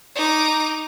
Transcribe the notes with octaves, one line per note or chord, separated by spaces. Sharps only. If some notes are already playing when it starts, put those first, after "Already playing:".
D#4 D6